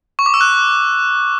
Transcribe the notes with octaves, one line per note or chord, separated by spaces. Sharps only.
C#6
D6
E6
F#6